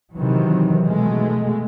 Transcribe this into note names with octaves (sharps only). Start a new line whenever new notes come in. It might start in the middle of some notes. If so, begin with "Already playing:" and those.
C3 D#3 E3 F#3
B2 G#3 A3